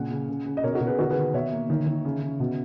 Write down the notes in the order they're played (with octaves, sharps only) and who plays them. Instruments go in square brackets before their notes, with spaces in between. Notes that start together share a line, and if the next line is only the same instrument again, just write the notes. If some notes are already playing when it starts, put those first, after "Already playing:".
Already playing: [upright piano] A#2 C#3 F#5
C#3
C#3
C#3
D#5
B2 A#4 C#5
F#4 A#4
B2
G#4 B4
D#3 F#4 A#4
G#4 B4
D#3
B2 C#5 E5
A#3
D#3
D#3
C#3
C#3
B2